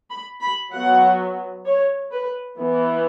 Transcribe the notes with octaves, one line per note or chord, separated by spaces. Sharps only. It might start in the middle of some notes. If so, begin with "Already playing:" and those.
B5
B5
F#3 B3 F#5
C#5
B4
E3 B3